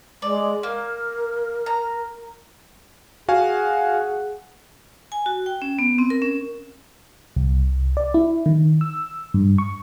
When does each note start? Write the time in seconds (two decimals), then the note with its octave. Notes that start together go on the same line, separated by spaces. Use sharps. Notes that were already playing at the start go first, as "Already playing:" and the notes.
0.22 G#3 D5
0.63 A#3 A#4
1.66 A#5
3.28 F#4 G#4 F5 F#5 G#5
5.12 G#5
5.26 F#4
5.46 G5
5.62 C#4
5.79 B3
5.98 C4
6.10 A#4
6.22 C#4
7.36 C2
7.97 D5
8.14 E4
8.46 D#3
8.81 E6
9.34 G2
9.58 C#6